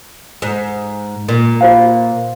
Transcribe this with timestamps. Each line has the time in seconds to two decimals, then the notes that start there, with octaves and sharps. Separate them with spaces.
0.42 G#2
1.29 A#2
1.61 F4 C5 F5